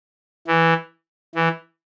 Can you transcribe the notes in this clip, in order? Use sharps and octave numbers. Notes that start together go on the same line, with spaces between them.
E3
E3